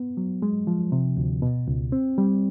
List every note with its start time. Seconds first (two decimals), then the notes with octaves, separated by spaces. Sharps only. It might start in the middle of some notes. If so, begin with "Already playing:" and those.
Already playing: B3
0.17 F#3
0.42 G#3
0.67 F3
0.92 C3
1.17 D2
1.42 B2
1.68 C#2
1.92 C4
2.18 G3